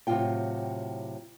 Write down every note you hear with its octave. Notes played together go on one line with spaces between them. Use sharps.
A2 C3 F3 F#3 F4 G5